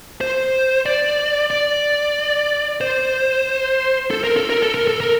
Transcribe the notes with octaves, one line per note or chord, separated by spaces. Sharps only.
C5
D5
D5
C5
A4
A#4
A4
A#4
A4
A#4
A4
A#4